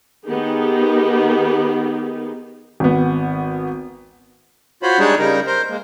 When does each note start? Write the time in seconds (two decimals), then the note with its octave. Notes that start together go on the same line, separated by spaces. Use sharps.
0.25 D#3 B3 D#4 G4 G#4
2.80 G#1 B3
4.83 F4 F#4 C5 C#5 B5
4.99 G3 G#3 D4 D#4 G#4 C#5
5.19 C#3 G3 D#4 A#4
5.47 A#4 C5
5.70 G#3 A#3